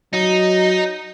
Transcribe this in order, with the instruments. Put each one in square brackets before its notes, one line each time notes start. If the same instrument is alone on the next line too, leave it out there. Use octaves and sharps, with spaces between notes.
[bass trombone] F#3 [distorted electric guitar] D#4